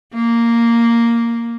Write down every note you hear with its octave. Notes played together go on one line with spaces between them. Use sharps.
A#3